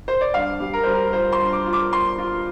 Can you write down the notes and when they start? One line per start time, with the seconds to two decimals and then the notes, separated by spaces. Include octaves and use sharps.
0.08 C5
0.21 D5
0.34 G2 F5
0.60 G3
0.73 A#4
0.84 G3 C5
0.94 A#4
1.13 F4 C5
1.32 C6
1.39 G2
1.53 D6
1.66 F4
1.73 D6
1.93 F4 C6
2.18 F4